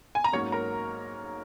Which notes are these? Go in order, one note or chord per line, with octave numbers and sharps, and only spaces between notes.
G#5
A#5
G#2 F#3 A#3 C#4 C#5 C#6
A#4 A#5